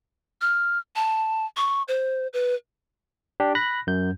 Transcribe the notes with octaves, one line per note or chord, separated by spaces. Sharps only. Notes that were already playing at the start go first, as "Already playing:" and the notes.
F6
A5
C#6
C5
B4
D4 G4
B5 F#6 A#6
F#2 G6